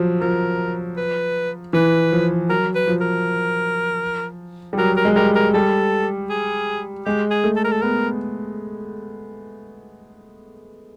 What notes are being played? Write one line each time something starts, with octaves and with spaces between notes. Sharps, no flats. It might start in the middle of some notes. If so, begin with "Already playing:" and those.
Already playing: F3 F#3
F3 A#4
B4
E3 B4
F3
F#3 A#4
B4
F3
A#4
G3
F#3 A#4
A#4
G#3
G3 A#4
A#4
G3 A4
G#4
G#3 G4
G#4
A3
A4
A#4
A4
B3 A#4